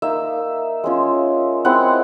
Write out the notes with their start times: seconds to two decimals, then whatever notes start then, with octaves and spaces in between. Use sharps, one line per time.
0.02 A#3 D#4 E5
0.84 G#3 C#4 F4
1.65 G#3 C4 E4 F#5